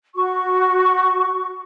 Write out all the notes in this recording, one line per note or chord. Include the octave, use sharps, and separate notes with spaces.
F#4 C#6